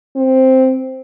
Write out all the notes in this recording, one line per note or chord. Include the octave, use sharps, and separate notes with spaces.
C4